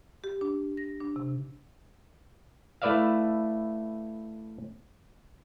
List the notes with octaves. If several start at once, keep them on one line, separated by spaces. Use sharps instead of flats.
G4
D4
A#6
D4
C3
A3 E4 B4 D5 E5 F5